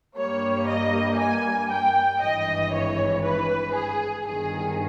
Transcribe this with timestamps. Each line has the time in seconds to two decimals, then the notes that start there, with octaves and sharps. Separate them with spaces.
0.17 G2 G3 A#3 C#5
0.68 D#5
1.18 G#5
1.71 G5
2.21 G#1 G2 E3 D#5
2.73 C#5
3.24 B4
3.74 G#4
4.26 G1 G2 D#3 G#4